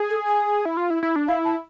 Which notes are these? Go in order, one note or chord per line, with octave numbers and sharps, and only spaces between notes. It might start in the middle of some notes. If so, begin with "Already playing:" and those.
Already playing: G#4
A4
G#5
E4
F4
E4
E4
D4
E4 F5
A5